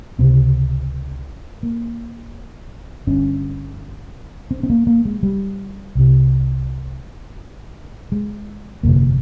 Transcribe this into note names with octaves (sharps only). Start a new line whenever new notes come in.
C#2 C3 C4
A#3
G1 G2 C#4
C4
C4
A#3
A#3
G#3
G3
C2 C3
G#3
G1 F2 C3 A#3